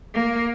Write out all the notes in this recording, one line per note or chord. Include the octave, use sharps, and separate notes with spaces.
A#3